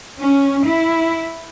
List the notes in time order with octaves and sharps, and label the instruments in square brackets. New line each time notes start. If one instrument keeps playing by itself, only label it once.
[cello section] C#4
E4